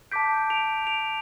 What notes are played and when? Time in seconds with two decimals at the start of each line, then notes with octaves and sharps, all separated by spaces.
0.11 A5 D6 G6 B6 D7
0.50 D7 F7
0.87 D7 F7